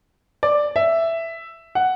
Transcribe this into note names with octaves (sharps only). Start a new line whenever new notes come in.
D5
E5
F#5